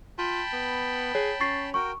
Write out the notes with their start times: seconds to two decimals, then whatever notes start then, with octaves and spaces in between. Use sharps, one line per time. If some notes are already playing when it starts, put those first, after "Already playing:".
0.18 F4 G5 A5 B5
0.53 B3
1.15 G#4 C#5
1.41 C#4 C#6 A6 C7
1.74 F#4 A#4 G5 C#6